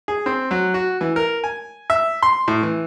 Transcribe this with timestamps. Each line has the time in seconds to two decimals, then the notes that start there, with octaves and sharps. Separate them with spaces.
0.08 G#4
0.26 C4
0.51 F#3
0.74 F#4
1.01 E3
1.16 A#4
1.44 G#5
1.90 E5
2.23 C6
2.48 A2
2.63 E3